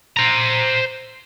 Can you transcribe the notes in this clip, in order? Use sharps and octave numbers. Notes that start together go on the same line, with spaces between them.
C5 A#5